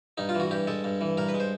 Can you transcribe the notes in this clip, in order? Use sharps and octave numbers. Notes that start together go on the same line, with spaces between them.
G2 D#4
F4
E3
F#4
G2 G4
G#3 A4
G2
E3
G2 A#4
B4
G#3
C5